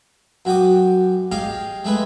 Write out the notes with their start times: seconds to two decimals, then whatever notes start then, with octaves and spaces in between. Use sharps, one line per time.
0.45 F#2 F#4 G5 D6 D#6
1.32 G4 G#4 D#5 F5 G5
1.84 G#3 A3 G#4 B4